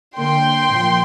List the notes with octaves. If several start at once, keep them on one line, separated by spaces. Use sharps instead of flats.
D3 A#3 G5 C6
A#2 F3